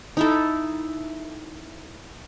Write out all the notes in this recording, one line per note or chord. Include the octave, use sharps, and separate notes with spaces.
D#4 E4 A4